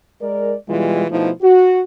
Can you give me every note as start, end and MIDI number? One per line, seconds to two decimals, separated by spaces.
0.21 0.54 56
0.21 0.54 70
0.21 0.54 74
0.68 1.05 47
0.68 1.05 52
0.68 1.05 55
0.68 1.05 56
0.68 1.05 64
0.68 1.05 65
1.11 1.30 47
1.11 1.30 53
1.11 1.30 57
1.11 1.30 63
1.11 1.30 64
1.42 1.82 66